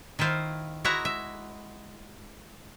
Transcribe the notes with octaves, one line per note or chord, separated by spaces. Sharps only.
D#3 E4 F4 C5 F5
G#3 E4 F#4 E5 F#5 A#5
E5